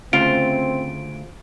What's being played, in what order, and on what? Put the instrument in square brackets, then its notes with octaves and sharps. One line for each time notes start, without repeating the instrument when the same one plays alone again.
[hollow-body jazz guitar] D2 C#3 A3 [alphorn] C4 [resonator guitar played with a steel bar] F4 C5 [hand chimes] D7